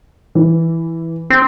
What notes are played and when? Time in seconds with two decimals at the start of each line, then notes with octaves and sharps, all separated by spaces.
0.35 E3
1.30 C4